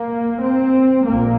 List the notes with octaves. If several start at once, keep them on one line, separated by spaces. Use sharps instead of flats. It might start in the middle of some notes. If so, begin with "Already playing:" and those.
Already playing: A#3
C4
A#1 A#2 A#3